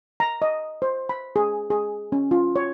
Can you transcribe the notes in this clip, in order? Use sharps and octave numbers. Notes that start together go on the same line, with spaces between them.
A#5
D#5
C5
B5
G#4
G#4
C#4
F4
C#5